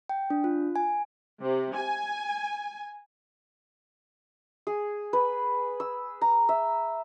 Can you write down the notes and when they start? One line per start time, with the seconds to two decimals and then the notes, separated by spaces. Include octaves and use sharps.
0.09 G5
0.30 D4
0.44 F4
0.76 G#5
1.43 C3
1.76 G#5
4.67 G#4
5.13 B4
5.80 E6
6.21 A#5
6.49 E5